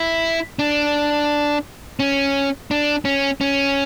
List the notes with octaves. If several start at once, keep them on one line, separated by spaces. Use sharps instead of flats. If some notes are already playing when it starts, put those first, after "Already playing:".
Already playing: E4
D4
C#4
D4
C#4
C#4